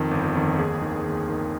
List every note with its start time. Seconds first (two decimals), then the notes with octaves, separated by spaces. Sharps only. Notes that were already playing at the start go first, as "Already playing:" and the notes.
Already playing: F2 D#3
0.11 G1
0.35 F2 D#3
0.58 D#2 G#4
0.82 D#3
1.06 D#2
1.29 D#3